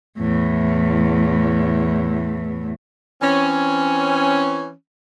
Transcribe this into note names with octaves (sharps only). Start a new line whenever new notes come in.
E2 A2
E3 C4 C#4